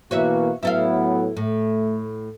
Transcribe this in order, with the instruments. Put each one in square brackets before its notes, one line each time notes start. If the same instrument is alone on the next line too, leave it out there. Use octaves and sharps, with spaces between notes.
[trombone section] B2 E3 A#3 [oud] F#4 C#5 E5
[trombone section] A2 F#3 B3 [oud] E4 A4 F5
[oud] A2 [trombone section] A3